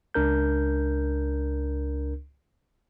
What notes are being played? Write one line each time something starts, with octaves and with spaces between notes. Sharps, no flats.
C#2 D4 A#4 G6